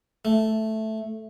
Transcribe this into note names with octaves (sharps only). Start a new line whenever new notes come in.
A3